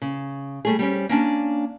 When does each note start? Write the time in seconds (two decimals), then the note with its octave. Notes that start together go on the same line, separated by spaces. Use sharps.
0.02 C#3
0.65 G3 A3 G#4
0.79 G3 C4 C#4
1.09 A#3 C#4 D4